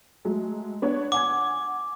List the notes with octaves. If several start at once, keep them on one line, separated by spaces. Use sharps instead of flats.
F#3 G#3 A3
B3 D4 C#5
F#5 G#5 D6 G#6